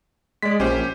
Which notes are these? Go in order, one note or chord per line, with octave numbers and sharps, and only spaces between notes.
G#3 D5 B6
A#1 C#4 G4 C5